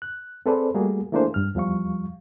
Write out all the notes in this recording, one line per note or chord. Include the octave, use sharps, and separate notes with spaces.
F#6
C4 G#4 A4 B4 C5 D5
G3 A3 A#3 F#4 G#4
E3 A3 A#3 D4 G#4 C5
G2 F6
E2 F3 G3 F5 C#6